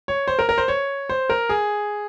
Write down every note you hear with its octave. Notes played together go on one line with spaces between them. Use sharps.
C#5
C5
A#4
A#4
C5
C#5
C5
A#4
G#4